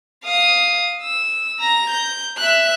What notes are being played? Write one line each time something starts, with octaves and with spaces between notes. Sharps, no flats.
F5 D#6
E6
A#5 A#6
G6
E5 F#6